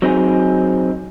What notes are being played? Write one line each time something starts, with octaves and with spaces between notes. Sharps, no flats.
F#3 C4 D#4 G#4